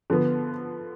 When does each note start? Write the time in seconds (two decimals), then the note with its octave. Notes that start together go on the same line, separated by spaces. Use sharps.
0.10 D3 F3 B3